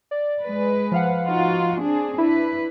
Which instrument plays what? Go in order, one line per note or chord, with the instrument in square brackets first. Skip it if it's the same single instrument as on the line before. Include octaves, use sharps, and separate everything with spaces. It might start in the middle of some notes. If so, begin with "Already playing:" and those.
[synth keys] D5
[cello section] G#3 B4
[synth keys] F3 F5 F#5
[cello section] D#4 F4 F#4
C4 D4 G#4
[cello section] D4 B4 [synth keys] E4